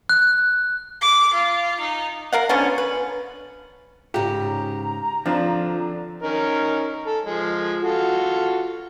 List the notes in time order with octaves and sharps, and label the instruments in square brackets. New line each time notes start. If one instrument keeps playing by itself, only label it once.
[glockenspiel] F#6
[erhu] D6
F4
D#4
[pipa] A#4 F5 F#5
D3 F3 B3 C#4
B4
[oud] G#2 C#3 [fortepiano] G4 [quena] A#5
[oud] D3 [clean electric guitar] F3 C4 F4 [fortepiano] D4
[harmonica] C#4 D#4 A#4
A4
F3 G#3
F4 F#4 A4